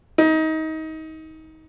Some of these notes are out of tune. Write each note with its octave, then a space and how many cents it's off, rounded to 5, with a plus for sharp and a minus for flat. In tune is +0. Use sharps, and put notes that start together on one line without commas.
D#4 +25